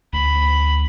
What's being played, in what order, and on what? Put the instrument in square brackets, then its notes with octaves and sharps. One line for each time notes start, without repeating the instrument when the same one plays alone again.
[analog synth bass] D2 [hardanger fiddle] B5